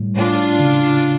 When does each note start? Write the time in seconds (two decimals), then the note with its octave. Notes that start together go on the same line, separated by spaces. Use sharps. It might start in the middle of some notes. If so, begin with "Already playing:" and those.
Already playing: A2 G3
0.15 A2 D4 F4
0.60 C#3